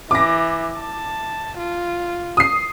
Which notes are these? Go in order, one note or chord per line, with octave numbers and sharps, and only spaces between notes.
E3 D6 A#6
A5
F4
D#6 C7